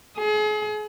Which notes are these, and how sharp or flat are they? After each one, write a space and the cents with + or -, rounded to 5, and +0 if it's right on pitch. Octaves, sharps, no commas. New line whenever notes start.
G#4 +35